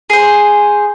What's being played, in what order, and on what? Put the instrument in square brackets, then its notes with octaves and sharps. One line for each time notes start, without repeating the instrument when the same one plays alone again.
[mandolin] G#4 C5